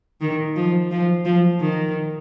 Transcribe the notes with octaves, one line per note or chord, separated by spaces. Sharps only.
D#3
F3
F3
F3
D#3